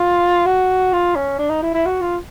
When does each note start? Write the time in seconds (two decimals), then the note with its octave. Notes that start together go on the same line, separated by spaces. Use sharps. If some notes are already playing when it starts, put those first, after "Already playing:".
Already playing: F4
0.46 F#4
0.93 F4
1.16 C#4
1.39 D4
1.50 D#4
1.62 E4
1.74 E4
1.86 F#4
2.01 F4